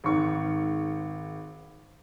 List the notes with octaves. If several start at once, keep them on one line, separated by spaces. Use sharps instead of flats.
G#1 G#2 C#6